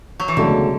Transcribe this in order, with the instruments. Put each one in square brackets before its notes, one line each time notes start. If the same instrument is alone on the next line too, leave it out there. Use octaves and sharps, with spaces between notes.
[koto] F#3
E3
[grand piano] C#2 B2 F#3 A3 [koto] D3